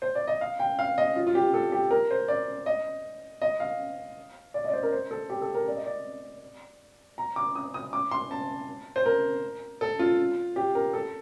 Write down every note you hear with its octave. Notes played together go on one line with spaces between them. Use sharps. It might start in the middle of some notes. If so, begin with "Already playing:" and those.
C5
D5
D#5
F5
G5
F5
D#5
F4
F4
G4
A4
G4
A#4
C5
D5
D#5
D#5
F5
D5
D#5
D5
C5
A#4
C5
A4
G4
A4
A#4
D5
D#5
D5
A#5
D6
D#6
D#6
D6
C6
A5
C5
A#4
A4
F4
G4
A#4
A4